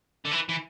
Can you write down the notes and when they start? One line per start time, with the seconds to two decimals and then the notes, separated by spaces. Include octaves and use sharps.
0.25 D3
0.31 E3
0.49 E3